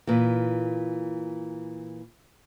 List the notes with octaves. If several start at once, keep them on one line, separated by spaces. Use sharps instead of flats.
A#2 E3